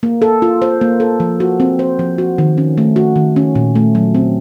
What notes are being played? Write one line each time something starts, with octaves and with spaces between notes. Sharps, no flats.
A#3
A4
F4
C5
A#3
A4
F3
F#4
C4
C5
F3
F#4
D#3
C#4
A3
F#4
D#3
C#4
A#2
A3
F#3
C4